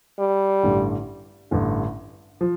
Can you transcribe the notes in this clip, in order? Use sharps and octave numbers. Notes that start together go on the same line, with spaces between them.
G3
A1 G2 D3
A1 G2 D3
F3